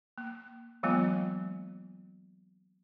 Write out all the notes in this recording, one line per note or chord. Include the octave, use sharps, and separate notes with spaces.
A#3
E3 F#3 G#3 A#3 B3 F4